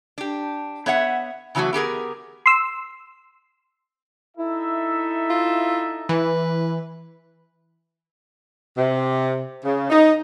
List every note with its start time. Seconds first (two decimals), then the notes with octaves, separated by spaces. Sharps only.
0.18 D4 G4
0.86 B3 C#5 E5 F#5
1.55 C#3 E3 F#3 A3 F#4
1.73 B3 G4 G#4 A#4
2.46 C6 E6
4.37 D#4 E4 A4 E5
5.30 F4
6.09 E3 B4
8.77 C3
9.65 C#3
9.90 D#4